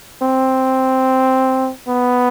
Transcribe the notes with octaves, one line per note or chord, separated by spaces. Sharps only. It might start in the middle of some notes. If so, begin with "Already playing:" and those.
C4
B3